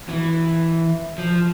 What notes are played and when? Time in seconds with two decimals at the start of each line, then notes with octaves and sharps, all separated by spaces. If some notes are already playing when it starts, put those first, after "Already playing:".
0.09 E3
1.18 F3